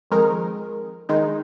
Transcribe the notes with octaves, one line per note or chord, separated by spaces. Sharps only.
F2 D#3 G#3 D#4 A#4
D#3 G#3 D#4